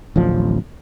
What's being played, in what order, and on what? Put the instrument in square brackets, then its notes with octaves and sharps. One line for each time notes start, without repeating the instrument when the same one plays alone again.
[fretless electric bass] D1 A1 F3